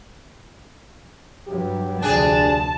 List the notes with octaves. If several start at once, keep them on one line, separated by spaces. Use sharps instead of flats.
G2 F#3 G4
F1 D2 D4 G#4 A5